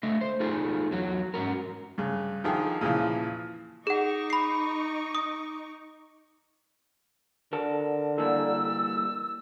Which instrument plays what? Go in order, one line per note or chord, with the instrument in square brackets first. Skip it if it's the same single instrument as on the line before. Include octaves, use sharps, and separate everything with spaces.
[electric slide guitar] D3 A3 D#5 E5
C5
D#4 F4 G#4 A4 G#5
E2 F#3 F#4
G#2 C#4 F#4 A#4
[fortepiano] G2 C#3
D3 D#3 F3 G#4 G5
A#2 C#3 E3 F3
[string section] D#4 C#6 D6 [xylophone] G#4 F#5
[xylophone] B5 C7
D#6
[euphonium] D3 [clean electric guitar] A#4 A5
[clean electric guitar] E3 G3 A#3 [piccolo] E6